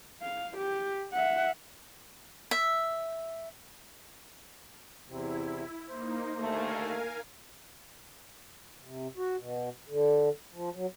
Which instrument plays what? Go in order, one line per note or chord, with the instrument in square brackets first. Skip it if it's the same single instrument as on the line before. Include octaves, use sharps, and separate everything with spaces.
[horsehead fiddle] F5
G4
E5 F#5
[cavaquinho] E5
[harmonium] E2 C3 [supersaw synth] E4
[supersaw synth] A#3 D#4 [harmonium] C5
[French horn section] D#2 D3 A3 [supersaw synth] A#4 F5 G#5
[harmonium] C3
F#4
B2
D3
F3
F#3